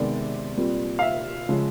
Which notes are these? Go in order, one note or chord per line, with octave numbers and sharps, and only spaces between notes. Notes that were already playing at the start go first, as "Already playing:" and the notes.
Already playing: C3 D#3 G#3 B3 D5
A#2 G3 C4
F5
E5
C#3 F3 G#3 C#4